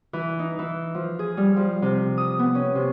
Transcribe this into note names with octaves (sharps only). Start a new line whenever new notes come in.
E3
D#4
E3
F3
G#4
G3
F3
C3
D#6
B3
C#4
C3